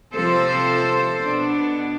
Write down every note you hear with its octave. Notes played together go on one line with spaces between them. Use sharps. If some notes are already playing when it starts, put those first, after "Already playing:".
C3 F3 C4 A4 C5
B2 B3 D4